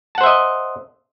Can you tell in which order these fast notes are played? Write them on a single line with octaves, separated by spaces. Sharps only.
A5 F#5 C5 E5 D#5